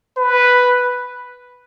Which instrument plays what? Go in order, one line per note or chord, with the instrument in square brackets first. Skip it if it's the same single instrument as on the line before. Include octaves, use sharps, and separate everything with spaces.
[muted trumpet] B4